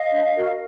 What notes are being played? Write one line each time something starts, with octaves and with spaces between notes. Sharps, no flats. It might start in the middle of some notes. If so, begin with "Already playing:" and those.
Already playing: D#5 F5
D4
F#4 A#4